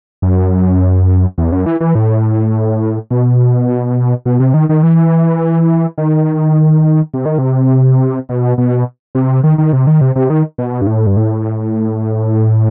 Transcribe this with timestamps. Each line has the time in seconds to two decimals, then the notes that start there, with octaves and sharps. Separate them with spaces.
0.22 F#2
1.38 E2
1.52 F#2
1.66 E3
1.80 E3
1.95 A2
3.11 B2
4.26 B2
4.40 C3
4.54 D#3
4.69 D#3
4.83 E3
5.98 D#3
7.14 C3
7.25 D#3
7.38 C3
8.29 B2
8.58 B2
9.15 C3
9.44 D#3
9.58 D#3
9.73 C3
9.87 D#3
10.01 C3
10.16 C3
10.30 D#3
10.58 B2
10.81 G2
10.87 A2
11.07 G2
11.17 A2